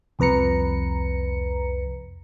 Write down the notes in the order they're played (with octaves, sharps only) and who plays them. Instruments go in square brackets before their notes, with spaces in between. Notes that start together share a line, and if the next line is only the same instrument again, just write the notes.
[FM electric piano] C2 F2 B4 A#5 C#7